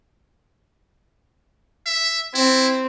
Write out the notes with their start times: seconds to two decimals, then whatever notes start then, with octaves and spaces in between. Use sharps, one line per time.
1.86 E5
2.34 C4 E4